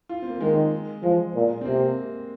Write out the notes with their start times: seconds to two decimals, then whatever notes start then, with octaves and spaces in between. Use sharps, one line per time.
0.09 F4
0.22 C4
0.30 A#3
0.41 D#3 G#3
1.03 F3 G#3
1.35 A#2
1.61 C4
1.65 C3 A#3